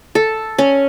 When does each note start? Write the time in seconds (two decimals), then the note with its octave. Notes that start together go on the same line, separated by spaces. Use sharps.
0.15 A4
0.58 C#4